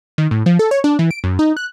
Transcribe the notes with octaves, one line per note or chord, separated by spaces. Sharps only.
D#3
A2
F3
A4
C#5
D4
E3
D7
F#2
D#4
F#6